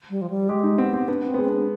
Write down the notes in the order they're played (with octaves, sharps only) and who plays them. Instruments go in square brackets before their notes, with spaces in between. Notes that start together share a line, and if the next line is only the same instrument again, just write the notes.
[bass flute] G3
F3
G3
[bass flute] G#3 [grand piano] G4
[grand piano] D#4
[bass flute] B3 [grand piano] C4
[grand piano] C4
[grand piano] B3 [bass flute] D4
[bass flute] C4
[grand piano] B3
G#3
[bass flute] C4
D4